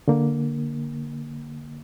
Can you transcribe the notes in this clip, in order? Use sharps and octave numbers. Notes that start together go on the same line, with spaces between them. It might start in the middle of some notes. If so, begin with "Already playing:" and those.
D3 A#3